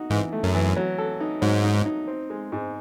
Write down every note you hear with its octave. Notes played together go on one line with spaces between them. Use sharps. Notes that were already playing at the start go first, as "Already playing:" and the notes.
Already playing: D#4 F#4
G#2 E3
A3
F#2
E3
F#3
A4
D#4
G#2 F#3
D#4
D#4
C4
G#3
G#2